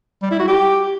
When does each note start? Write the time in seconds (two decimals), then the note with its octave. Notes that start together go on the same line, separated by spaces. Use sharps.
0.22 G3
0.31 E4
0.39 F#4
0.48 G4